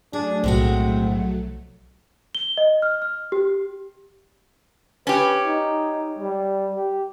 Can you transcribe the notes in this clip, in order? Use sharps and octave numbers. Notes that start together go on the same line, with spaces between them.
F#3 A3 D4 G#4
B1 A2 F3 G#3 C4 F#4
G7
D#5
F6
F6
G4
C#4 G4 B4
D#4
G3
G4